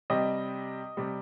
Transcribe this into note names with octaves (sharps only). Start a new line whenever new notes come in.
C3 G3 C4 D#5
C3 G3 C4